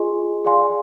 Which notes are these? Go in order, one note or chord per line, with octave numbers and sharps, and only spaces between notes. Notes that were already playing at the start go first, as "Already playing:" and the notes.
Already playing: F4 G#4 D#5 G#5 C6
G#4 D5 F5 G#5 C6